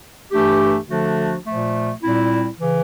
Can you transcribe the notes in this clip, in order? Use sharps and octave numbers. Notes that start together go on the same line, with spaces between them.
G2 E3 A3 D4 G4
D3 F3 A3 D4 F#4
A#2 F3 A3
A#2 G3 C4 E4
C#3 E3